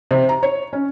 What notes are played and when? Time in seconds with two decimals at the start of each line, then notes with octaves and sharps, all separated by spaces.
0.11 C3
0.29 A#5
0.43 C#5
0.73 C#4